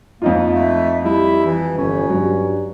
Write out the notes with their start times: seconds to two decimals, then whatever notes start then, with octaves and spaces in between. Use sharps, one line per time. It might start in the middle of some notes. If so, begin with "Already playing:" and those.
0.22 F2 A#3 D#4 F4
0.55 A3
1.05 G3 E4
1.46 E3
1.78 G1 C#4
2.09 G2 F#3